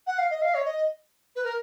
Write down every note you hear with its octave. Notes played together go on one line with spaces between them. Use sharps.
F#5
F5
D#5
F5
C#5
D#5
B4
A#4